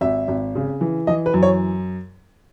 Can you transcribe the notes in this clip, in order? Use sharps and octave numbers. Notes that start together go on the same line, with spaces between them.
G#1 E5
G#1
C#3
E3
E3 D#5
B4
F#2
C#5